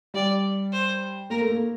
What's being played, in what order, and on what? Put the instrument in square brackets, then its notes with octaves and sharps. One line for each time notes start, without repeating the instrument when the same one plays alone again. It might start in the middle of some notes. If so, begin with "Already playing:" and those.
[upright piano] G3 [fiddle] D5
[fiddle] C5
[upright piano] A#3 [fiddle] A#4
[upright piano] A3
A#3